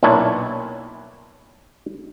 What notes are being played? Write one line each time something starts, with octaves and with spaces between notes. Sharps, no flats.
B1 A#2 D4 E4 C#5 A5